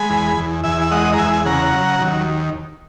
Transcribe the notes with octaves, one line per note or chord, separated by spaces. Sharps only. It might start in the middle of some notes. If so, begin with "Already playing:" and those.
Already playing: G#3 G#5 B5
E2
E2
E2 E5 G#5
E5
G#3 D#5 F#5
A#5
E2 E5 G#5
G#5
C#3 F#5 A#5
F#3
D#2